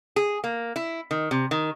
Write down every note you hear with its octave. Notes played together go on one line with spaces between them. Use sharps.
G#4
A#3
E4
D#3
C3
D#3